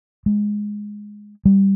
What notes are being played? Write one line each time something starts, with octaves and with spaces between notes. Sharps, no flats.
G#3
G3